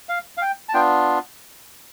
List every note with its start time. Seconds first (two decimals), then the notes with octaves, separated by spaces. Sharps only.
0.09 F5
0.37 F5
0.42 G5
0.69 A5
0.74 B3 D4 F4 G5